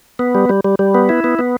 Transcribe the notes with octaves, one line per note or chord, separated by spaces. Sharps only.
B3
G3
G3
G3
G3
B3
E4
B3
B3